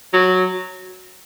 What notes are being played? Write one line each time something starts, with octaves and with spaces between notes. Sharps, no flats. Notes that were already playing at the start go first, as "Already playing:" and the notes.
F#3